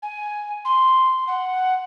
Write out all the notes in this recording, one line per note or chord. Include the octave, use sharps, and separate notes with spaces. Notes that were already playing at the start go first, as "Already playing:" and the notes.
G#5
C6
F#5